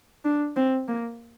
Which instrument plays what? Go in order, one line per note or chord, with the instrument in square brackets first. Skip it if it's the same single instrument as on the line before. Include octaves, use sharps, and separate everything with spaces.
[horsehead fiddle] D4
C4
A#3